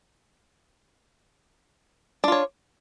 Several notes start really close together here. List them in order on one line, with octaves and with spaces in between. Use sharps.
D4 F4 C#5